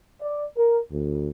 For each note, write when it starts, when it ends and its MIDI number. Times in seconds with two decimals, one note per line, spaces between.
0.21 0.46 74
0.57 0.78 70
0.91 1.28 38